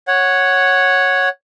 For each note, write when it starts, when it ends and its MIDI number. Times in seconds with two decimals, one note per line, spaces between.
0.08 1.29 73
0.08 1.29 78